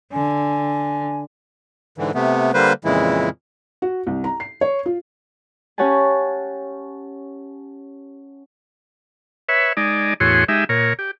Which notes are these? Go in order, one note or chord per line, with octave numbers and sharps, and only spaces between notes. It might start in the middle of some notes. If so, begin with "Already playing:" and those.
D3 G#5
G#2 D3 E3
C3 A3 B3
D3 G3 A#3 B4 C5
F2 A#2 C#3 E3 G#3 E4
F#4
C2
A#5
C7
C#5
F4
C#4 G4 C#5 F#5 G#5 A5
B4 C#5 E5
G#3 D#4 D5
E2 A2 F#4 G#4 C#5 C6
G#3 D#4 G4 E5
A#2 A#4 C#5
G4